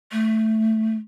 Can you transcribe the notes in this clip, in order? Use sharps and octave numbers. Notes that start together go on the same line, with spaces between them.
A3